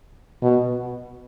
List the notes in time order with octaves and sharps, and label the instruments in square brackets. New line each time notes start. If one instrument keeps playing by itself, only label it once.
[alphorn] B2